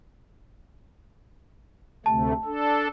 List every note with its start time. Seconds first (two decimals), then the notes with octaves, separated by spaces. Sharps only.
2.06 D2 C3 A3 A5
2.45 D4 A4